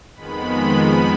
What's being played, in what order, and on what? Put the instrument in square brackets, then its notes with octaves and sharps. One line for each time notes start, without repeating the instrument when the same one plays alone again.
[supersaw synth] F2 D#3 G#3 B3 B5